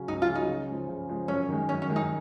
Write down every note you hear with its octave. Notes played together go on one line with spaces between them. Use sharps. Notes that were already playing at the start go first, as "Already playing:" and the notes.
Already playing: C#3 F#3 C#4
C#2 D#4
F4
C#3 F#3 C#4
D#4
C#3
F3 G#3
C#3
F3 G#3
F#2 C#4
D#3 G#3
F#2 C#4
C#4
D#3 G#3
D#4